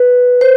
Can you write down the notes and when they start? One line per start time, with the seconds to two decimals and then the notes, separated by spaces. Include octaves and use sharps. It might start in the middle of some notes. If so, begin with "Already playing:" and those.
Already playing: B4
0.41 C5